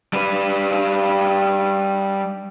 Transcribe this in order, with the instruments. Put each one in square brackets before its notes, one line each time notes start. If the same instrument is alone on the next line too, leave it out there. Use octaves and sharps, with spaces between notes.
[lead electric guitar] G3 B4